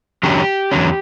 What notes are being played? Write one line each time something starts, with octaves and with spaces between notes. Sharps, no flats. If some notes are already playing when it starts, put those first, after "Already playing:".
E2 D3 F#3 C#4 G4
E2 D3 F#3 C#4